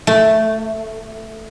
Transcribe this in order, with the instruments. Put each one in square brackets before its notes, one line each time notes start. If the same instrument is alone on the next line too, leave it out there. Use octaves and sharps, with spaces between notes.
[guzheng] A3